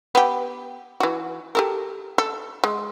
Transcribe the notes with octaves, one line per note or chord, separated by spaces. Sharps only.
B3 G4
E3 F#4
G4 A4 A#4
A4
G#3